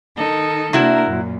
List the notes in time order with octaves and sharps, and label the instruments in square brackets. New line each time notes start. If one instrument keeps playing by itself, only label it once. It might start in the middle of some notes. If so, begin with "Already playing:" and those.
[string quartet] D#3 D#4 A4
[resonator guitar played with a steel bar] C3 E4 F#4 [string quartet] A#3 D4 A#4
[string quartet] F#2 A#2